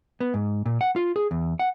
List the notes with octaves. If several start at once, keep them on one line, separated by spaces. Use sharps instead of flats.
B3
G#2
A#2
F#5
F4
G#4
E2
F#5